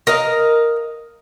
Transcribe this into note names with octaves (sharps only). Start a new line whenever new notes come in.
A#4 D#5 F5